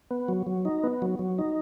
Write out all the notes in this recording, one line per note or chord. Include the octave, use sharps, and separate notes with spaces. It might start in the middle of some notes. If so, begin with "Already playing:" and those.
B3
F#3
F#3
D#4
B3
F#3
F#3
D#4